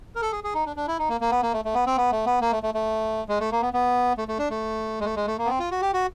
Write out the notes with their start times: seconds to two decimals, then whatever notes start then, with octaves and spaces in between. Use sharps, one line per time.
0.16 A#4
0.22 A4
0.32 G#4
0.44 G#4
0.54 D#4
0.66 D4
0.76 D4
0.88 E4
0.99 D#4
1.09 A#3
1.21 A#3
1.31 B3
1.43 A#3
1.53 A3
1.65 A3
1.75 B3
1.87 C4
1.98 B3
2.12 A3
2.26 B3
2.42 A#3
2.52 A3
2.63 A3
2.74 A3
3.29 G#3
3.40 A3
3.52 A#3
3.62 B3
3.73 B3
4.18 A3
4.28 A3
4.39 D4
4.50 A3
5.00 G#3
5.05 A3
5.16 G#3
5.27 A3
5.38 A#3
5.45 B3
5.49 C4
5.60 F4
5.71 F#4
5.81 G4
5.93 F#4